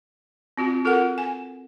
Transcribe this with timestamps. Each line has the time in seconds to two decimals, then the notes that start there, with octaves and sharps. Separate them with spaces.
0.57 C4 F4 F#4
0.85 F4 A4 A#4 F#5
1.18 G#5